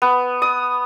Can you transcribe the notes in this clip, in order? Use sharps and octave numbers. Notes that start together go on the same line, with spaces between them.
B3
D#6